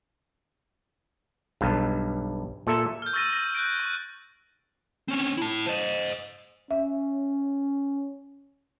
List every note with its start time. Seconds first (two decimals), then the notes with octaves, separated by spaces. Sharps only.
1.61 B1 G2
2.67 A#2 A4 E5
3.02 F6 G6
3.13 C#6 E6 F6 A6 A#6 D#7
3.33 A#6
3.55 F#6 G6 D7
3.80 C#6
5.08 C4 C#4
5.37 E4 A5
5.66 C5 D#5
6.71 C#4 E5